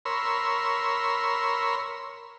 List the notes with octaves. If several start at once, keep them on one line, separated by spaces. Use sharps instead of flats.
A#4 C#5 B5 C6 E6